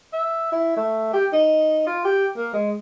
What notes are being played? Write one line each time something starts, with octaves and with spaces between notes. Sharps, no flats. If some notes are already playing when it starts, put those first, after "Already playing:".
E5
E4
A3
G4
D#4
F4
G4
A#3
G#3